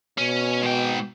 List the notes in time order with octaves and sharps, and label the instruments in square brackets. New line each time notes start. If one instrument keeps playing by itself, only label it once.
[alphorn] B2 [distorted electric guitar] C#4
[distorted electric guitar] G#2 G5